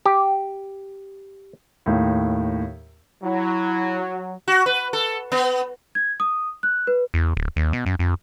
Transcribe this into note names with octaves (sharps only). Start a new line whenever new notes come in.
G4
D#2 A2
F#3 E4
F#4
B4
A4
B3
G#6
D#6
F#6
B4
E2
D1
D#2
B2
F#2
F2